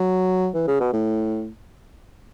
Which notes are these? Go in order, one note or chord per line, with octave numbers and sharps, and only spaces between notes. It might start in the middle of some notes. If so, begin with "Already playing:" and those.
Already playing: F#3
E3
C#3
B2
A2